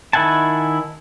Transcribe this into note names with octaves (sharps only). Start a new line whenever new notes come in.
D#3 E4 F#5 G#5 A5